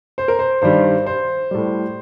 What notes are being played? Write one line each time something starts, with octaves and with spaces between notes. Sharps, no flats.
C5
A#4
C5
G2 D#3 G3 C5
C5
A2 G3